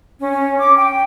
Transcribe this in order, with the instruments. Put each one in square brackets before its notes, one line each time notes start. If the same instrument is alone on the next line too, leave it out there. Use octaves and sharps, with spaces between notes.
[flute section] C#4
D6
G5